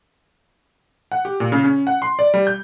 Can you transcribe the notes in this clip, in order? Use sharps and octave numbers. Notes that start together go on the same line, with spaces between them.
F#5
G4
A#2
C#3
C#4
F#5
C6
D5
G3
G6